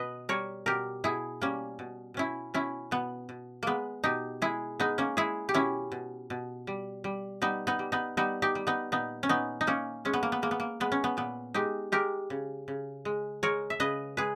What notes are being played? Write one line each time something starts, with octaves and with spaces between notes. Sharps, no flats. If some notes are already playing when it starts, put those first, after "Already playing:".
Already playing: B2 B4 D#5
G3 A#4 C#5
B2 G4 A#4
B2 E4 G#4
G3 A#3 C#4
B2
B2 C#4 E4
B2 C#4 E4
B2 B3
B2
G#3 A#3 B3
B2 D#4 G4
G#3 E4 G#4
G#3 B3 D#4
A#3 C#4
G#3 E4 G#4
G4
B2 C#4 E4
B2
B2
G3
G3
G3 B3 D#4
B3 D#4
G3
B3 D#4
G3 B3 D#4
D#4 G4
G3
B3 D#4
A#2 B3 D#4
C#4
A#2 B3 D#4
D#4
A#2 A#3 C#4
G#3 C#4
B3
A#3
B3
G#3 A#3
B3
A#3
G#3 B3
C#4
B3
A#2 B3
G#3 D#4 G4
G#3 G4 A#4
C#3
C#3
G#3
G#3 A#4 C#5
E5
C#3 B4 D#5
G#3 G#4 B4